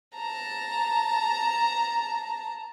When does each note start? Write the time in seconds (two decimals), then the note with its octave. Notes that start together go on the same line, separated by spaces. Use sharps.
0.15 A5 A#5